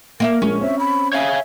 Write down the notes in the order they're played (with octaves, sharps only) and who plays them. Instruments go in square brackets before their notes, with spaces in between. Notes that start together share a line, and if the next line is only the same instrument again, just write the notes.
[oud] A#3 D#5 E5 [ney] A#4
[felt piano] A#1 G#3 [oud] C#4
[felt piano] C4 C5 C#5 [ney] E5
[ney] B5
[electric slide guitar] C#5 F5 G#5 [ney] E5